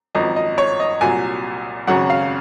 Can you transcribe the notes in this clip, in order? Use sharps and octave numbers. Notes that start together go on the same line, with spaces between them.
G#1 F#2 F3 D#5
D#5
C#5
D#5
C2 A#2 F#3 G#5
G#1 F#2 C#3 F#3 C#4 F#5
F5